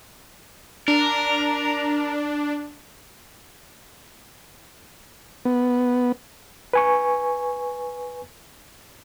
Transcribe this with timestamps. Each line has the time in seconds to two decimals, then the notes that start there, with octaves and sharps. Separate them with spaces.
0.88 D4 A#4
5.45 B3
6.73 B4 G#5 C#6